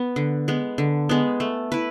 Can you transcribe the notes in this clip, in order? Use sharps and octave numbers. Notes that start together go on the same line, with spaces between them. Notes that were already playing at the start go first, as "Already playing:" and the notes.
Already playing: B3
D3
G#3 B3
D3
G#3 B3
A3
E4 B4